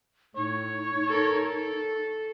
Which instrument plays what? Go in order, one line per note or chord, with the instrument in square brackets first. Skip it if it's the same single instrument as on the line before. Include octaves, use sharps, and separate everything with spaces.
[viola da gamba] A2 [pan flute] D#4 [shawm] C#5
[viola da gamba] A4 A#4
A4